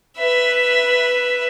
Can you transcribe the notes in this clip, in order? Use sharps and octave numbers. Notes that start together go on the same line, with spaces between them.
B4 E5